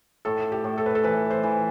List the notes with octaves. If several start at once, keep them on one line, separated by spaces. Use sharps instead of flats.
A2 A4
G4
A2
A4
B4
A4
E3 B4
C5
E3